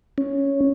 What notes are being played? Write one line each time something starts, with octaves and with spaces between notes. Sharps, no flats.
C#4